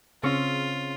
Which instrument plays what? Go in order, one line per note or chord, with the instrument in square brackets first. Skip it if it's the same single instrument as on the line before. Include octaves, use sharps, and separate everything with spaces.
[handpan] C#3 [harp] C4 C#4 C#6 [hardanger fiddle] F4